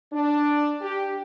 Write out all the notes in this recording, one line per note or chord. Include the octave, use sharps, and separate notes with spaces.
D4
G4